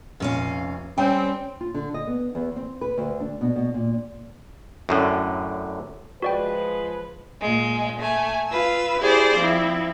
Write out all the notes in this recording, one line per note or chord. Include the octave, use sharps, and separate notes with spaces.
F1 A#2 C#4 F5
G3 C4 C#4 G5
F4
D3
D#5
B3
E2
C4
B4
D2
D4
B2
B2
A#2
F#2 A2 D3
F3 G#3 F#4 B4 D5 G5
A#2 G#3
A3 G#5
F4 B4 E6
E4 G4 G#4 C5 D5
F3 C4 E4